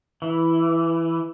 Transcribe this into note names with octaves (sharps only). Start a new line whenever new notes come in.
E3